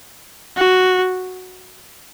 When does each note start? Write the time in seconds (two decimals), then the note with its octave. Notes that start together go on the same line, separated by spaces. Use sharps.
0.57 F#4